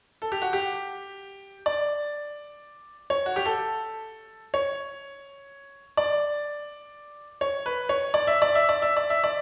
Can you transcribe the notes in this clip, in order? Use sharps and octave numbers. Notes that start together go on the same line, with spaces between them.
A4
G4
F#4
G4
D5
C#5
F#4
G4
A4
C#5
D5
C#5
B4
C#5
D5
E5
D5
E5
D5
E5
D5
E5
D5